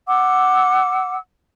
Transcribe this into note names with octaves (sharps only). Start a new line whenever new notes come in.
F#5 D6 E6